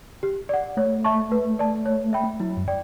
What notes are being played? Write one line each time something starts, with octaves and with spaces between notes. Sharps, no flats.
G4
D5 F#5
A3 C#5
E5 A5 C#6
B4
D5 A5
C#5
E5 G5 B5
F#3 E4
F#2
D5 G5